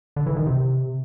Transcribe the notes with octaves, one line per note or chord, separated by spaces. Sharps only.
D3
E3
D#3
C3